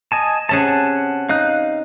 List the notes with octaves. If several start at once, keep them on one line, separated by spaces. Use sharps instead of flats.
D#5 G#5 A5
C3 C#4 G#4 F#5 A5
D#4 F5 F#6